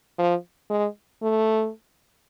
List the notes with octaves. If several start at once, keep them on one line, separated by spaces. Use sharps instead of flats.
F3
G#3
A3